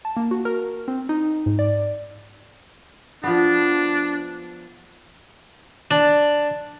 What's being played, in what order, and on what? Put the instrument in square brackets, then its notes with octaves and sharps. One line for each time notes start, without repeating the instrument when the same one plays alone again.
[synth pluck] A5
A#3
F#4
A#4
C4
D#4
G#2
D5
[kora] F3 B3 [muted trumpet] D4
[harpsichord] D4